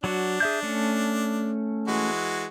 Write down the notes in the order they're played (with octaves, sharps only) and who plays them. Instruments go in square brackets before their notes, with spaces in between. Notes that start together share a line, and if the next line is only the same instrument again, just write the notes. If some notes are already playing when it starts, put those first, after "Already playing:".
[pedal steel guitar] F#3 F#4 [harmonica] D4
[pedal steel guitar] G#4 E5 G6
A3 C#4
[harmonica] E3 G#3 F#4